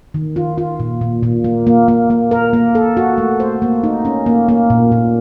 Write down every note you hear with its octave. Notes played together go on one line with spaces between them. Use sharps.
D#3
F4
F4
A#2
A#2
A#2
A#3
A#3
A#3
A#3
A#4
A#3
A4
F#4
A3
C5
A#3
D#4
C#4
A#3
A#3
A#2
A#2